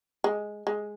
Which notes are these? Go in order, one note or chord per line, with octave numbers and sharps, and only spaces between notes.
G#3
G#3